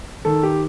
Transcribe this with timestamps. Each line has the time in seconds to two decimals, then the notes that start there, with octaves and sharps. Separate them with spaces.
0.25 D#3 A4
0.43 G4